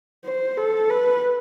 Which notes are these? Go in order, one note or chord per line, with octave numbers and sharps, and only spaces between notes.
C5
A4
B4